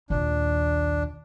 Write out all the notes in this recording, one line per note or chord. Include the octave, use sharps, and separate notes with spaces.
A#1 D#2 D4